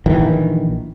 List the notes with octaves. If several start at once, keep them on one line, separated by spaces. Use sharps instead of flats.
A#1 D#3 E3